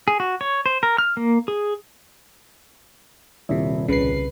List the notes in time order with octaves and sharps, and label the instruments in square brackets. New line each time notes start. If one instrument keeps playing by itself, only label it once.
[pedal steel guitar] G#4
F#4
C#5
C5
A#4
F6
A#3
G#4
[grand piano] D#1 [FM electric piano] D#2 C3 [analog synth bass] E4
[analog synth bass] C2 [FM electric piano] C#3 C7 [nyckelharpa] B4